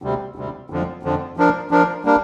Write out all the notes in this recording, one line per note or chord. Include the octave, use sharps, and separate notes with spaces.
D2 C3 G3
D2 C3 G3
F2 D3 F3
F2 D3 F3
F3 D4 A#4
F3 D4 A#4
G3 A#3 D4 A#4